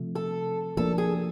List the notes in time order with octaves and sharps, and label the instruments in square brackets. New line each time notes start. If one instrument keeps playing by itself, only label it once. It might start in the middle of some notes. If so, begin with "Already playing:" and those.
Already playing: [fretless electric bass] C3 F3 A3
[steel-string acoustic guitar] A4
[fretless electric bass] F3 A#3 D4 [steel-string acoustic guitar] A4
[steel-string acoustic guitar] G#4